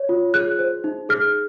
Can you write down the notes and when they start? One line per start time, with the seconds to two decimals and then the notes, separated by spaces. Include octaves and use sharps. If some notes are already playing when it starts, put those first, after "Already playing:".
Already playing: C#5
0.09 F4
0.34 G#4 F#6
0.59 C5
0.84 D#4
1.09 G#4 F6